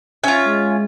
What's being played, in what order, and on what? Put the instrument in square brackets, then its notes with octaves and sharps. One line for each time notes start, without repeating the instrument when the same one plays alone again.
[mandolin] C#4 F4 [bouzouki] E5
[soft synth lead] G#3